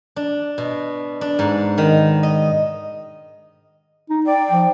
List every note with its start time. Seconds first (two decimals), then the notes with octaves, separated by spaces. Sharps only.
0.16 D4
0.58 B2
1.21 D4
1.39 G#2
1.78 D#3
2.23 D#5
4.09 D#4
4.26 D5 G5
4.51 F3